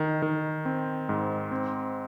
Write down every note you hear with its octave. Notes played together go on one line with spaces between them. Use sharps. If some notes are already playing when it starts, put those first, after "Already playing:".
Already playing: D#3
D#3
C4
G#2
C4